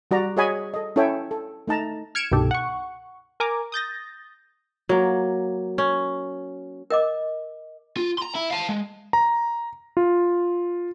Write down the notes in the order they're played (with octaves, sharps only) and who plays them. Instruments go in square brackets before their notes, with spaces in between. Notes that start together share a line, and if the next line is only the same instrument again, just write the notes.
[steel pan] G3 F#4 D5 A#5
F#4 G#4 C#5 D#5 G#5 B5
A4 D#5
C#4 E4 A4 C#5 E5 G5
A4
A3 D#4 A5 A#5
[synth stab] F6 G#6 C#7 D7 E7
C2 G2 B2 D#3 G4 A4
F#5 C#6
A#4 G#5 A#5 D6
D#6 G6 A6 A#6
[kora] F#3 A#3
C#4
[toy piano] A#4 D#5 D6
[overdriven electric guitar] F4
A#5 C6
E4
F5 A5
G#3
[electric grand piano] A#5
F4